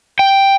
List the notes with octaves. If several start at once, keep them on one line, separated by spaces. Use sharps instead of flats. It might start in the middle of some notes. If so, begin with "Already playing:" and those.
G5